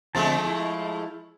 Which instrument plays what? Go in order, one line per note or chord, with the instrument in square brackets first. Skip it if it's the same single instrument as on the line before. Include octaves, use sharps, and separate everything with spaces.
[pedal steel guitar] D3 C4 A5 [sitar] F3 G#3 A3
[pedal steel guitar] E4